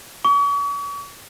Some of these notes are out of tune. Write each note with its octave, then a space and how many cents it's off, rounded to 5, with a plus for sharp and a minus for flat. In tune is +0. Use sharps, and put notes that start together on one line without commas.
C#6 +40